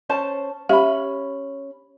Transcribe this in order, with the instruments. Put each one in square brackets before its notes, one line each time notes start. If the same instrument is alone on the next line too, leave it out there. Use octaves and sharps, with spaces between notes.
[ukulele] C#4 C5 A5
[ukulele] C#4 B5 [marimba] G4 E5 F5